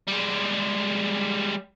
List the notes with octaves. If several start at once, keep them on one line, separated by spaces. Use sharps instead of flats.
G3 G#3